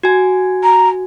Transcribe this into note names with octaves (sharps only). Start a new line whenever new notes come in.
F#4 G#5
A#5